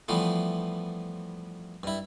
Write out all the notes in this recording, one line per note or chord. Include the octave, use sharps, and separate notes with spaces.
E3 F3 G3 A3 B3
G2 E4